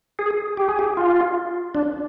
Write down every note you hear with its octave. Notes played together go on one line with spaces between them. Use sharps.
G#4
G4
G#4
G4
F4
D4